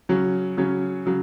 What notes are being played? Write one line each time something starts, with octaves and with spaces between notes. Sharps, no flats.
C#3 F#3 C#4
C#3 F#3 C#4
C#3 F#3